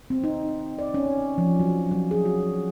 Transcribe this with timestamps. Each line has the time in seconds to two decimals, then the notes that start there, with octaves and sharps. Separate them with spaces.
0.10 C4
0.24 D#4
0.79 D5
0.94 C#4
1.38 F3
1.60 F#3
1.91 F#3
2.11 G#4
2.25 F#4